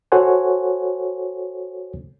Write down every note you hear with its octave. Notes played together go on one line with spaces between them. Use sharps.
F#4 A4 C5 C#5 F#5 G#5